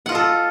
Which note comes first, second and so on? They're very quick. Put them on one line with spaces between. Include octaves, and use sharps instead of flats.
F#5 F4 D#5 A4